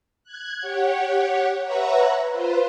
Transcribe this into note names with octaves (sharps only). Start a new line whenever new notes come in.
F#6 G#6
G4 C#5 F#5
B4 C#5 E5 F#5 A#5
F4 B4 C5